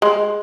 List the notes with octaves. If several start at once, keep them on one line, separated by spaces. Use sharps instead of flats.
G#3